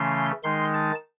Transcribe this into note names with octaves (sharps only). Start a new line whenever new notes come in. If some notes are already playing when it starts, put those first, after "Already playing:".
Already playing: C#3 E3 A3 C#4 C6
D#3 G#3 D#4 C6
A5